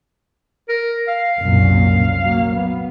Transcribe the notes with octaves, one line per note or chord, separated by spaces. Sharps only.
A#4
F5
C2 F#2 A#2
F#3 A#3
B3